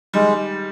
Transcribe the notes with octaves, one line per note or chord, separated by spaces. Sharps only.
D#3 G3 G#3